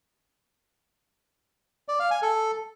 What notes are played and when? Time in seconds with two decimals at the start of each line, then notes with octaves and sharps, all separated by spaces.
1.88 D5
2.00 F5
2.11 G#5
2.22 A4